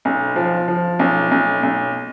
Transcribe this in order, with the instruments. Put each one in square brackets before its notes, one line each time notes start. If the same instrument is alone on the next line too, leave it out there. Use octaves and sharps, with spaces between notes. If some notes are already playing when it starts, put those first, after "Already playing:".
[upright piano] B1
F3
F3
B1
B1
B1